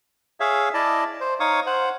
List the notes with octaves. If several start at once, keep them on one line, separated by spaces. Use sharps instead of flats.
G#4 C#5 E5 F5
E4 D5 D#5 A5
C5
D#4 C#5 F5 C#6 D#6
C5 F#5